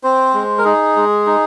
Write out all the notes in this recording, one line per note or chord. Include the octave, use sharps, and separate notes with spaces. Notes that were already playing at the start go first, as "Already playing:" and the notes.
C4 C5
G#3
A#4
D#4 G#4
G#3
D#4